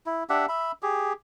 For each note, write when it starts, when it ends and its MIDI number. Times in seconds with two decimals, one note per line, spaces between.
0.06 0.23 64
0.30 0.46 62
0.30 0.46 67
0.30 0.46 76
0.30 0.46 78
0.49 0.72 76
0.49 0.72 83
0.83 1.13 67
0.83 1.13 68